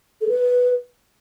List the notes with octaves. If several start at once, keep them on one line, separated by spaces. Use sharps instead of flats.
A4
B4